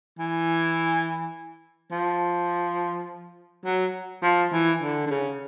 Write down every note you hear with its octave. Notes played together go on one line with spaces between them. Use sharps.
E3
F3
F#3
F3
E3
D3
D3
C#3